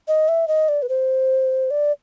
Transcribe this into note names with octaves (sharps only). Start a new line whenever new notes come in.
D#5
E5
D#5
D5
B4
C5
D5